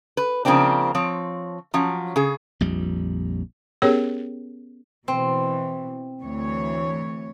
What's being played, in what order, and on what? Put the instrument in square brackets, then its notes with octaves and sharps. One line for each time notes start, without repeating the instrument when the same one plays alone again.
[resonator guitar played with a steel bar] B4
C#3 F3 A#3 C4 D4
F3 C4 C#5
F3 F#3 C#4
C#3 G#4
[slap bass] A#1 F2 G3
[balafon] B3 C#4 G4 G#4 A#4 C#5
[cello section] B2 E3 [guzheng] C4
[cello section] D2 E3 C#5